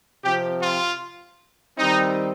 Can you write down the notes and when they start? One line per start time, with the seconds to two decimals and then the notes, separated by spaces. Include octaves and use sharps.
0.24 C3 F3 C4 G4
0.62 F4
1.78 D#3 G3 C4 D#4